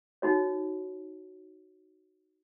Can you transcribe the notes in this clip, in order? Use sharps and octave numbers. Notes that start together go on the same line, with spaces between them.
D#4 F#4 C#5